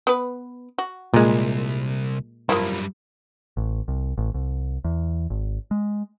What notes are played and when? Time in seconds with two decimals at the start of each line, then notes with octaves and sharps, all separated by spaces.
0.07 B3 B4
0.78 F#4
1.14 C2 A#2 G#3
2.49 F#2 F3 G3 A#3 E4
3.57 A1
3.88 C2
4.18 A1
4.34 C2
4.84 E2
5.30 G#1
5.71 G#3